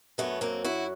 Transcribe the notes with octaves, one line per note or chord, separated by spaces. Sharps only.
F#2 D3 F#3 A3 B3
A#3 C4
E4 F#4